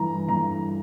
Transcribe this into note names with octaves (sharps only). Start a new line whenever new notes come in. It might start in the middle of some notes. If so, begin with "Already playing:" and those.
Already playing: G2 E3 A#5
G2 A#5